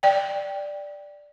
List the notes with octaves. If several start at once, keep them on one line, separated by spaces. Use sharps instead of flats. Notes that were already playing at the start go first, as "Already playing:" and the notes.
D5 G5